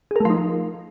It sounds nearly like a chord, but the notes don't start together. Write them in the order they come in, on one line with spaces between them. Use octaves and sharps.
G#4 A#4 A3 F3 D#4